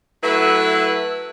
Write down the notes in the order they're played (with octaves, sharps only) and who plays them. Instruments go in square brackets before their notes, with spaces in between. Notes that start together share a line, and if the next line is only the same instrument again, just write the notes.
[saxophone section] F#3 A3 E4 B4